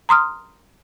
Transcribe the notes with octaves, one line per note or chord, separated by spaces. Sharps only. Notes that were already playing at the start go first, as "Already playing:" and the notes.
A#5 C6 D#6 F6